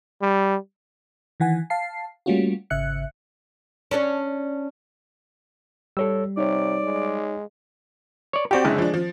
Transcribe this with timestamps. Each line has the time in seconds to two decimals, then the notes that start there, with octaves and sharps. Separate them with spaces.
0.22 G3
1.40 D#3 E3 F#5 G#5
1.70 F5 A5 C7
2.26 G3 A3 A#3 C#4 F4 F#4
2.70 G#1 C#3 E5 F#6 C#7
3.91 C#4 D4 C#5
5.97 G3 A4 C#5 E6
6.37 C3 D#4 C#5 D5
6.83 G#3
8.33 C#5 D5
8.51 C4 F#4 G4 D5 G5
8.65 F#1 D3 G#3 E4
8.78 F3 D4
8.94 F3